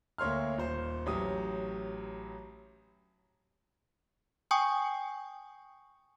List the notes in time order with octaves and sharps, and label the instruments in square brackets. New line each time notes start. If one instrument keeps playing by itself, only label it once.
[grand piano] D2 A#3 C#5 C6 F6
D#1 C5
A1 F#3 G4 D#6
[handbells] G5 G#5 C#6 D#6 G6